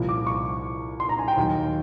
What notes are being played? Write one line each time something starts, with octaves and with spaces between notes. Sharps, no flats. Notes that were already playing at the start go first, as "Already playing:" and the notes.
Already playing: C2 A#2 F3
D6
C#6
C6
A#5
G#5
G5
D#2 D#3 F#3